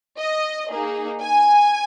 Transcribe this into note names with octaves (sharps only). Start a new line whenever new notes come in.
D#5
A#3 D#4 G#4
G#5